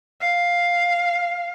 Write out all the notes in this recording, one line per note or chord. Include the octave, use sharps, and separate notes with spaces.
F5